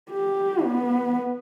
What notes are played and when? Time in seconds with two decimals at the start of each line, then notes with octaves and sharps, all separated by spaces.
0.11 G4
0.63 B3